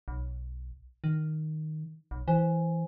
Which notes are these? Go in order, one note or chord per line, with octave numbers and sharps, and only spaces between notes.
B1
D#3
B1
E3 C5 G#5